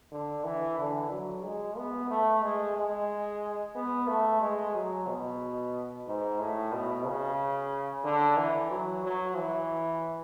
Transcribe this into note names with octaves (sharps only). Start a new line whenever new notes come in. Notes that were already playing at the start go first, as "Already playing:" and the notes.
D3
E3
D3
F#3
G#3
B3
A3
G#3
G#3
B3
A3
G#3
F#3
B2
G#2
A2
B2
C#3
D3
E3
F#3
F#3
E3